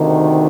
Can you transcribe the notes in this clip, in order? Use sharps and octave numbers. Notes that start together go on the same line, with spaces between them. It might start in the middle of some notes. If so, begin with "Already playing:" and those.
Already playing: D2 C3 D#3